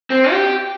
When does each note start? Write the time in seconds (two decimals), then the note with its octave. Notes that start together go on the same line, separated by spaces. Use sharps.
0.10 C4
0.31 G4